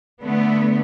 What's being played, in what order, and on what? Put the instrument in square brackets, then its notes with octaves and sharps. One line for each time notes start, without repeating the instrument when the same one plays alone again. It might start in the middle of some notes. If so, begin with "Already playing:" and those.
[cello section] D3 A3 B3